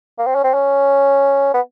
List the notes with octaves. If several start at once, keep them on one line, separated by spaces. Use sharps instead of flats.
A#3
C4
C#4
C4
C#4
B3